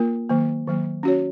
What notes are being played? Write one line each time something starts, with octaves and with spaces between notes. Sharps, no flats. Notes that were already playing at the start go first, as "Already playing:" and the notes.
Already playing: A#3 F4 A#4
D#3 F#3 A#3
D#3 F#3 A#3
C#4 F#4 C#5